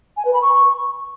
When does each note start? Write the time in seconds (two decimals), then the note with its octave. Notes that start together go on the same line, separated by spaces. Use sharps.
0.17 G#5
0.25 B4
0.34 B5
0.42 C#6